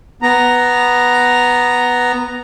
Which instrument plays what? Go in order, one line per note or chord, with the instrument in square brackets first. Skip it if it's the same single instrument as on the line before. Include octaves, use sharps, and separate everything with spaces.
[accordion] B3 A#5